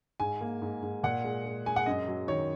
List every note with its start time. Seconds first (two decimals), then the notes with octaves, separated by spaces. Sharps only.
0.20 G#2 G#5
0.41 A#3
0.62 G#2
0.82 G#2
1.03 A#2 F#5
1.24 G#3
1.45 G#3
1.66 G#3 G#5
1.76 F#5
1.86 F#2 D#5
2.07 F#3
2.28 D#3 C#5